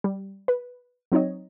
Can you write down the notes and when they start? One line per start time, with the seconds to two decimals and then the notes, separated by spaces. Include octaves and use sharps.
0.04 G3
0.48 B4
1.12 F#3 C4 D#4 C#5 D#5